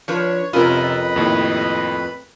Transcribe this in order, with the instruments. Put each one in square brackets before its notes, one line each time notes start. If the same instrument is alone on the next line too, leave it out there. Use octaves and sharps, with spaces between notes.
[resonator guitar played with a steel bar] F3 D4 B4 [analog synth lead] C#5
[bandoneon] F2 B4 B5 [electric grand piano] C3 F4 [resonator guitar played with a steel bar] C#4 A#4 [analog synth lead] D#5
[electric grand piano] D#2 A2